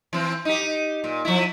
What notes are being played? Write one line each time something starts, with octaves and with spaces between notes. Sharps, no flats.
E3 C4
D#4 G4
A#2
F3 E4